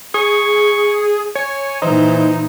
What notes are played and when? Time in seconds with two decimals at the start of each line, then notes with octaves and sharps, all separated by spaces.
0.14 G#4 C#6
1.35 C#5 G#5
1.82 A#2 E3 D#4 C5